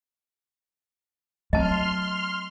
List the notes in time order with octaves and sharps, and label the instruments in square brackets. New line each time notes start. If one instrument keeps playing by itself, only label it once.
[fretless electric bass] F#3 C4 [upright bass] A3 [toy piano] D#5 A5 [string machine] C6 F6